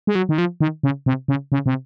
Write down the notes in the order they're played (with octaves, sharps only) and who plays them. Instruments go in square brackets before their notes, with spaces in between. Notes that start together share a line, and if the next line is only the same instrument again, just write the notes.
[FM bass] G#3
F#3
D#3
F3
D#3
C#3
C3
C#3
C#3
C3